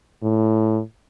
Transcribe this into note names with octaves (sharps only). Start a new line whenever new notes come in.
A2